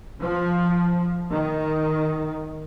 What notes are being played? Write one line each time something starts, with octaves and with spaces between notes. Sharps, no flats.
F3
D#3